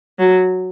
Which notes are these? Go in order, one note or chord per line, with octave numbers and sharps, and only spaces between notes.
F#3